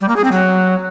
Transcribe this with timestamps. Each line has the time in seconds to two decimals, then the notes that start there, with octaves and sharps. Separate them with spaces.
0.01 G3
0.09 A#3
0.16 G#4
0.24 C4
0.32 F#3